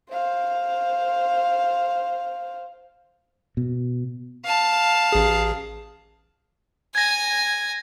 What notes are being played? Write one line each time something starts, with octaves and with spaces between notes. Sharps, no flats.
C5 F5
B2
F5 A5
A1 G#4
G#5 G#6 A#6